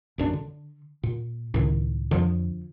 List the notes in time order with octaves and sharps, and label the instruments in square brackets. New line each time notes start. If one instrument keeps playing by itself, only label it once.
[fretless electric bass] A#1 F#2 D4
D3
A#2
[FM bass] C#2 [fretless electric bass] A2 D#3
[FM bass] F2 [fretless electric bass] D3 F3